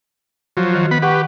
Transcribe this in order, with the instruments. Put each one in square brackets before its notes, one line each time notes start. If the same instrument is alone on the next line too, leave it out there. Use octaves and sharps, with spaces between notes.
[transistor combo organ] F3 F#3
[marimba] D#3
[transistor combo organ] B3 B5
[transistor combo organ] G4 B4 [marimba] F#5 C#6